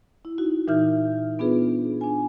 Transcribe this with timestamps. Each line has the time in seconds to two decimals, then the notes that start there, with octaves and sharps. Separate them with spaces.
0.25 E4
0.38 D#4 F#4
0.67 A#2 E3 D#4 E5 F6 G6
1.39 B3 D4 F4 G#4 B4
2.01 D4 G#5